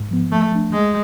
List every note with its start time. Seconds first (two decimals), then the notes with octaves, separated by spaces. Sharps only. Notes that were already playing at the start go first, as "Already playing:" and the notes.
Already playing: G#2
0.11 F3 B3
0.31 F3 A3
0.52 A3 D4
0.73 C#2 G#3